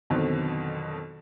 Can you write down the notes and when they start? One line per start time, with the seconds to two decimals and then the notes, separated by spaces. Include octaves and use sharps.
0.10 F2 B2 D3 D#3 F#3 C4